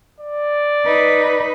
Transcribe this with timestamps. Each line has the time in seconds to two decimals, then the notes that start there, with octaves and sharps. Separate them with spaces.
0.20 D5
0.85 D#4 B4